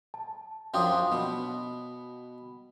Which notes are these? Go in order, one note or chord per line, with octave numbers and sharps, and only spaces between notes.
A5
F#2 F3 D4 G5 D#6
B2